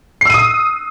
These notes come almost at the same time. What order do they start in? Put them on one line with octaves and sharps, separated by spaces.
C7 E6 D#7 D#6